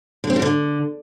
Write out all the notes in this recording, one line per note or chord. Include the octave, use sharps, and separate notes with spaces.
D3
C4
G#2
D3